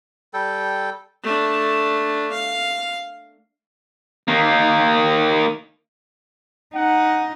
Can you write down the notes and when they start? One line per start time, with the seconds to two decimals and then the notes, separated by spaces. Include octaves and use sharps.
0.34 G3 A4 G5
1.23 A3 D4
2.32 F5
4.28 D#3 A#3
6.75 D#4 F#5